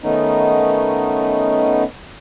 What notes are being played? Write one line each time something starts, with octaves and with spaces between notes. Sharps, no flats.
D#3 A3 B3 C#4 D#4